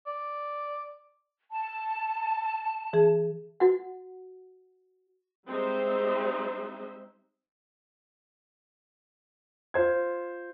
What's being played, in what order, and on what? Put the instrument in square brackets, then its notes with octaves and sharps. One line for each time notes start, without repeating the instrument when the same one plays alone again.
[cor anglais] D5
[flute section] A5
[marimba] E3 G#4
[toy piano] F#4 F#5
[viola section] G3 G#3 C4 D#4 C5 E5
[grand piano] F4 C5 G#6